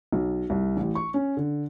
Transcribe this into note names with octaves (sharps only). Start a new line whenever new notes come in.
B1
C2
A1
C#6
C#4
D3